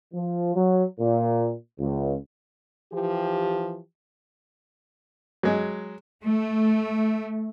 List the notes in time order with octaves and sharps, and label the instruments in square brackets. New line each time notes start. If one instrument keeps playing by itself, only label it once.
[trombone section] F3
F#3
A#2
C#2
[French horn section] E3 F3 G4
[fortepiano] F#3 G#3
[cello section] A3